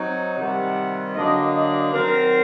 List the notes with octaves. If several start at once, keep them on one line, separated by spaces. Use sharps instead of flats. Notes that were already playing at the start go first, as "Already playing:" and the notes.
Already playing: F#3 C4 D#4
C3 D#3 G3 F#5
D3 F#3 A#3 D4 D#5
D#5
D#3 F#3 C4 A#4